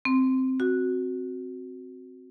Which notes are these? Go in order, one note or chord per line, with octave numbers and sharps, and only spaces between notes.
C4
F#4